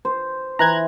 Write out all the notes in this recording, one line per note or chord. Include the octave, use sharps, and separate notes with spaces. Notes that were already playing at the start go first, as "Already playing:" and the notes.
C5
E3 A#5 F#6 G#6